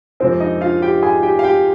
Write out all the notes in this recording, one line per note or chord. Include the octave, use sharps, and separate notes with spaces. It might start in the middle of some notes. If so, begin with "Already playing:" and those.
F2 C3 F3 G#3 C4 C5
D#4 D#5
F4 F5
G4 G5
G#4 G#5
G4 G5
F5
G4 G5